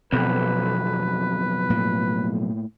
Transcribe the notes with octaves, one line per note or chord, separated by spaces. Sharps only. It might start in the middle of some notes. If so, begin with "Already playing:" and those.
B1 F2 B2 C4 B4
A2 A#3